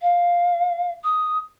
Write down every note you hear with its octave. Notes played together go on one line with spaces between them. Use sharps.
F5
D#6